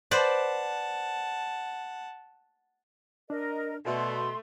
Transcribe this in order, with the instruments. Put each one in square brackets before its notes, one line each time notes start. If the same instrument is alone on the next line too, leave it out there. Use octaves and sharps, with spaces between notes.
[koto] B4 C5 D5 [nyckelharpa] F#5 A5
[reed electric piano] D4 [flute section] A#4 D#5
[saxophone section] B2 [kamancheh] A3 [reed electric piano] A4 D5 E5 [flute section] C6